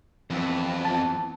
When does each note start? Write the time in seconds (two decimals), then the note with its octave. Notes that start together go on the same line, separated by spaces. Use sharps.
0.30 F2 E3 B3 C4
0.85 A5